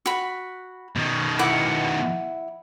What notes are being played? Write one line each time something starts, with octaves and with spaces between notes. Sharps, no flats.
F#4 B5
B2 D#3
E4 F#5 D6